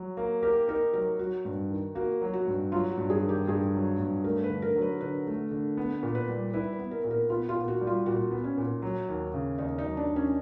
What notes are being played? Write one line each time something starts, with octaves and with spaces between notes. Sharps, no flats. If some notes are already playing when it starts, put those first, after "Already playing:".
Already playing: F#3
A#3
G4 A#4
D#4 A#4
F#3 A#4
F#3 F#4
G2
D#3
A#3 F#4
F#3
F#4
G2
F#3 F4
F#4
G2
G#4
D#3
G4
G2 G#4
F#3
G2
A3 A#4
B4
D3
A#4
F#3
B4
D3 B4
A3
D3
B3
A#2
B4
G3
E4 B4
B4
B3
A#4
A#2
A#4
B3 F4
F4
A#2
F#4
G3
F4
A#2 F#4
B3
C#4
A#2
F#3
D#2
C#3
D#2 D#4
D#4
F#3
D4
D#2
C#4